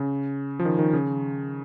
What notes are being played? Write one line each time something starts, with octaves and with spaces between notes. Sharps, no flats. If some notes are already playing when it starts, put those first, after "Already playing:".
Already playing: C#3
F3
D#3
D#3
C#3